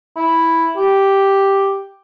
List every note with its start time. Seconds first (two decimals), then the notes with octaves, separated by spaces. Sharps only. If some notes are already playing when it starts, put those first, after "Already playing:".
0.16 E4
0.77 G4